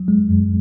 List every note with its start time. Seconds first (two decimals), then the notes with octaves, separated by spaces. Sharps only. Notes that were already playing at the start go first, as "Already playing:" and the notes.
Already playing: F#3
0.08 G#3
0.29 F#2